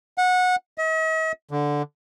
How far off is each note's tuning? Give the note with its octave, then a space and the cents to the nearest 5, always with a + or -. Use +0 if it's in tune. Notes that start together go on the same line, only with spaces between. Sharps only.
F#5 -20
D#5 +45
D3 -5